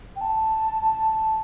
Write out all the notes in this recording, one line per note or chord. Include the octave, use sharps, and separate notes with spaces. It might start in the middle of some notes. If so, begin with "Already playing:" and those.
G5
A5